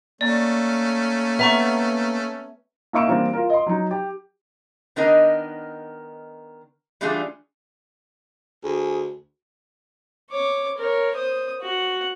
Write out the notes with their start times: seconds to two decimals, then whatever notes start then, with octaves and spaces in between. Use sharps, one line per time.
0.21 A3 A#3 C#4 D5
1.39 B3 E5 A#5 C#6
2.93 A#3 D#4 E5 C#6 D7 E7
3.07 E3 G3 A#3 C4 D4
3.33 F4 A#4
3.50 D#5 C6
3.66 F#3 D#4
3.91 G4
4.96 D#3 B3 D4 D#4 A#4 D#5
7.01 E3 G3 A3 D4 F4 G#4
8.64 D2 G#4
10.31 C#5 D6
10.78 A#4 C#5
11.15 C5 D#6
11.61 F#4 F#5